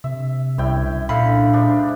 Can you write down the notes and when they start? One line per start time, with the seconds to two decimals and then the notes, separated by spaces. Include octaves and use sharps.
0.04 C3 E5
0.58 C2 F#2 E4 G5
1.09 A#2 D3 E5 F5 B5
1.53 G#2 D4